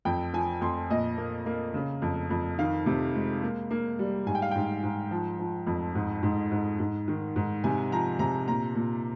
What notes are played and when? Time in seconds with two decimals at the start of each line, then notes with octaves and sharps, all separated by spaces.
0.05 F2 G5
0.33 F3 G#5
0.61 F2 C6
0.90 A#2 D#5
1.18 A#3
1.46 A#3
1.74 C#3
2.02 F2
2.30 F2
2.59 D#3 F5
2.86 C3
3.15 G#3
3.43 A#3
3.71 A#3
3.99 G3
4.26 G#2 G#5
4.35 G5
4.42 F5
4.51 G#2 G5
4.83 G#2
5.11 F3
5.39 F3
5.67 F2
5.95 G#2
6.23 G#2
6.52 G#2
6.79 G#2
7.08 D#3
7.36 G#2
7.64 C3 G#5
7.92 F3 A#5
8.19 C3 A#5
8.48 A#2 A#5
8.75 A#2